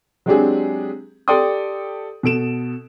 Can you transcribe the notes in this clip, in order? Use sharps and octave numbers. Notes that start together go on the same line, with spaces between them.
F#3 G#3 C4 D4 G4 G#4
G4 A4 D5 G5 C6 D#6
B2 A4 D7 E7